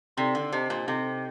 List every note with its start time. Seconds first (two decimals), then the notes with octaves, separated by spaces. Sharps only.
0.17 C3 D#4 A4 D5 G5 C6
0.35 D3
0.52 C3 G4 C5 D#5 A5
0.70 A#2
0.87 C3 D#4 A4 D#5